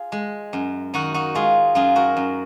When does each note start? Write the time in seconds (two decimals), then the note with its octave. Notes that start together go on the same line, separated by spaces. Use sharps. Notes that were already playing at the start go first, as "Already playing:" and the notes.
Already playing: F4 G#4
0.12 G#3
0.53 F#2
0.94 D#3 D#4 F#4
1.14 D#4 F#4
1.35 G#3 F4 G#4
1.75 F#2 F4 G#4
1.96 F#4 A#4
2.17 F#2